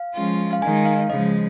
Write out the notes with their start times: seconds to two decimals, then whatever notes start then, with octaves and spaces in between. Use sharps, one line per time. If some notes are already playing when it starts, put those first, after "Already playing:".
Already playing: F5
0.15 F3 G#3 C#4 F4
0.53 F5
0.62 D#3 G#3 D#4 G#5
0.85 F5
1.09 C#3 F3 G#3 D#5